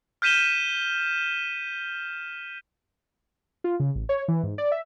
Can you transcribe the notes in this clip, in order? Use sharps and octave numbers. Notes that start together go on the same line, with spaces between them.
F6 G6 B6 D#7 E7 G7
F4
C#3
A1
C#5
E3
G#2
D5
E5